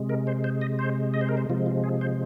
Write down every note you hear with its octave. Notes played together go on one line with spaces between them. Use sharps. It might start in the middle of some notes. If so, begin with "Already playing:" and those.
Already playing: C3 G#3
A#4
C5
C5
D#5
C5
D#5
C5
A#4
C5
C3 F3 G#3 F4
F4
G#4
C5